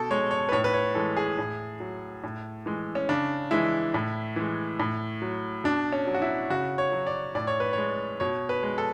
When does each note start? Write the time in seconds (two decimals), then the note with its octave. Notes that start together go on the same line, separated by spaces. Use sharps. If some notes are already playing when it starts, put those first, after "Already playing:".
Already playing: B2 A4
0.11 G#3 C#5
0.31 C#5
0.49 B4
0.52 A2 C#5
0.64 B4
0.74 C#5
0.95 E3 G#3 A4
1.17 G#4
1.38 A2
1.80 F#3
2.24 A2
2.66 E3 G#3
2.95 C#4
3.09 C#3 D4
3.51 E3 G#3 E4
3.94 A2
4.36 E3 G#3
4.80 A2
5.22 F#3
5.64 B2 D4
5.92 C#4
6.07 F#3
6.14 F#4
6.22 E4
6.50 C#3 F#4
6.78 C#5
6.92 F#3
7.07 D5
7.35 A2 D5
7.47 C#5
7.60 B4
7.73 C#5
7.78 G#3
8.20 B2 C#5
8.49 B4
8.63 G#3
8.78 A4